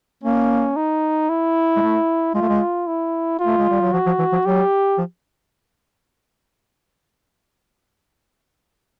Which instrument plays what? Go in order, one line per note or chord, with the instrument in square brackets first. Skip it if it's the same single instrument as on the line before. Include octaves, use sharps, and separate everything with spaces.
[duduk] A#3 [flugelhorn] C#4
[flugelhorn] D#4
E4
[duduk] G#3
A3
[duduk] G#3 [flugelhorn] F4
[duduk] A3
G#3
[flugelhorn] E4
F4
[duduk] A3
G#3
G3
F#3
[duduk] F3 [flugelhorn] F#4
[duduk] F3
E3
F3
[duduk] F#3 [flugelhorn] G4
[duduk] F3